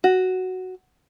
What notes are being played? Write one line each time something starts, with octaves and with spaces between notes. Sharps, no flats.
F#4